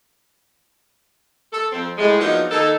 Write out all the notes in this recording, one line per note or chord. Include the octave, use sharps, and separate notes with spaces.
A4
F2 C4
A2 G#3
F3 F#3 A#3 B3 D4 D#4
D#3 A#3 D#4 A4